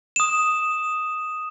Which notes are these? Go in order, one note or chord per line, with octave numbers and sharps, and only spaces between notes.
D#6 E7